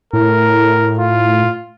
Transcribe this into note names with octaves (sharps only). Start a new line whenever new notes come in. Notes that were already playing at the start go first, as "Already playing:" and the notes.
A2 A#4
F4